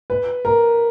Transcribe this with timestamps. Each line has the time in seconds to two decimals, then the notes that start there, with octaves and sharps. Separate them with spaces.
0.10 B4
0.45 A#4